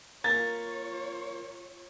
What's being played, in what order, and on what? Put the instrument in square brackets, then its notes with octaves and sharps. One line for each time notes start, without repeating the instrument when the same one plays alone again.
[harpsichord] A#3 [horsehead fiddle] F4 C#5 [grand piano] A6